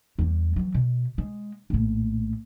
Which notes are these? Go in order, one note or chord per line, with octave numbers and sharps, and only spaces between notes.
E2 G3
E3 F#3
B2
G#3
A#1 A2